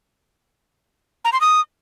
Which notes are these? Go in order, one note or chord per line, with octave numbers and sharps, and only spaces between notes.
A#5
C6
D#6